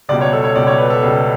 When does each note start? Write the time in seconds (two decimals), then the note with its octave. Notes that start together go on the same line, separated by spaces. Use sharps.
0.09 C#2 B2 G3 D5
0.21 C#5
0.33 A4
0.44 C#5
0.55 C#2 B2 G3 D5
0.67 C#5
0.78 B4
0.90 A4
1.02 C#2 B2 G3